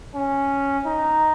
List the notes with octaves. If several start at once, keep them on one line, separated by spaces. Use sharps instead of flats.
C#4
D#4